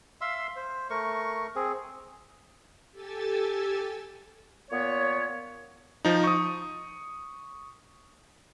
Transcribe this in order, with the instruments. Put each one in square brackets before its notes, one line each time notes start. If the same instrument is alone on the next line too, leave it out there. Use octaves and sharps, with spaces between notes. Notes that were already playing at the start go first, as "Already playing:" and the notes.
[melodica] E5 F5 C6 E6
C5
A3 A#4 C#6
C4 G#4
[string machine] G4 A4 G#5 E6 A6
[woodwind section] A#2 B3 C#5
[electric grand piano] F3 D#4
C#6 D#6